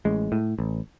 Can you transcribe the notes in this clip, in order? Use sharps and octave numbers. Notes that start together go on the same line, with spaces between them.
A1 G#3
A2
A1